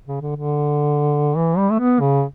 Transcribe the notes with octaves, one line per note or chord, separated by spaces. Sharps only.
C#3
D3
D3
E3
G3
A3
B3
C#3